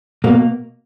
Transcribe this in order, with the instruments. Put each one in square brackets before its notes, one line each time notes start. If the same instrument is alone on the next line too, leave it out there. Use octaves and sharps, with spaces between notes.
[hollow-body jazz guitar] B2 A#3